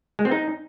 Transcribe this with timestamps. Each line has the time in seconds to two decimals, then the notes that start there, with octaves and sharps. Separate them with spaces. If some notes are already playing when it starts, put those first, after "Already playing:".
0.19 G#3
0.25 C4
0.31 D#4